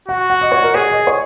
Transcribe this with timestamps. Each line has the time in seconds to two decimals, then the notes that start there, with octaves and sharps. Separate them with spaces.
0.08 F#4 F#5
0.30 F#5
0.41 D#5
0.52 C#5
0.63 A#4
0.74 G#4 C#5
0.91 D#5
1.07 C#5